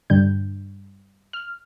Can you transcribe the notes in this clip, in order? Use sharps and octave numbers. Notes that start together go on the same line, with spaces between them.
G2 D3 G3 G6
F6